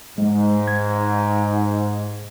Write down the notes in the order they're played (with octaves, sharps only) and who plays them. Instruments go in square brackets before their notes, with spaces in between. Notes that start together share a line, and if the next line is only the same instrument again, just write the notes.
[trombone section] G#2 [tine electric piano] G#3
[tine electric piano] G#6